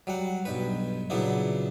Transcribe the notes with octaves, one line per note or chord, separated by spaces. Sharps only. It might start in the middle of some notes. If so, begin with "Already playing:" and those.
F#3 G3 F#5
B1 G2 B4
A#2 C#3 F#3 B3 D4 E4